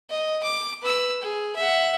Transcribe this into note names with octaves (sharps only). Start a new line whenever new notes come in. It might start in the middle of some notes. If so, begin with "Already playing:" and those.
D#5
D6
B4 E6
G#4
E5 F#5